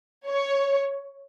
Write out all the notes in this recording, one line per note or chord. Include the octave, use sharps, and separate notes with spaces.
C#5